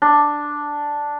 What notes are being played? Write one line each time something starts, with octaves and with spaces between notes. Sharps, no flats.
D4